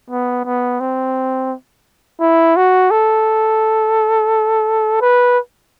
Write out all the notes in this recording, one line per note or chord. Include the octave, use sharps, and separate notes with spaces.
B3
B3
C4
E4
F#4
A4
B4